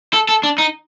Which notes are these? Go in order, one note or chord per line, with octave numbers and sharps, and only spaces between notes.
A4
A4
D4
D#4